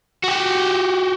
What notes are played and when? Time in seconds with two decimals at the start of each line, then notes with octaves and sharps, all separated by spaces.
0.24 F#4 G4